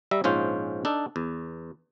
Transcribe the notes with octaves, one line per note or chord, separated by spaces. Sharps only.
G3 E5 A#5
A#1 G#2 C#4 F4 C5
D4 D#4 A4
E2